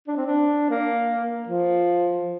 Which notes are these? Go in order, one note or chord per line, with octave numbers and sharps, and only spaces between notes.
D4
C4
D4
A#3
F3